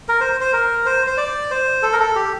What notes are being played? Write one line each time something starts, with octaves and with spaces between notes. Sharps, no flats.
A#4
C5
C5
A#4
C5
C5
D5
C5
A4
A#4
A4
G4